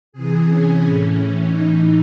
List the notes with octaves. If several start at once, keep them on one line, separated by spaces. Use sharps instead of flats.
C3 E3 G#4
C#4
A2 E3
C#4
A2 E3 D#4